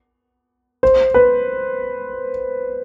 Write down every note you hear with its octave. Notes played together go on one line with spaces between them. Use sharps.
C5
B4